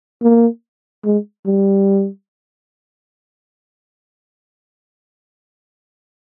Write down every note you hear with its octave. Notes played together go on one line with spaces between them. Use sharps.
A#3
G#3
G3